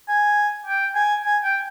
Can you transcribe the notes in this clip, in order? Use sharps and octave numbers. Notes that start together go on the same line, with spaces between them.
G#5
G5
G#5
G#5
G5